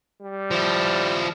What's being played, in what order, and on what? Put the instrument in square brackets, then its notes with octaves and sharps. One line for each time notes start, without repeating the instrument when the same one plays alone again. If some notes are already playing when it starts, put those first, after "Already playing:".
[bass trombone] G3
[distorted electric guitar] F3 E4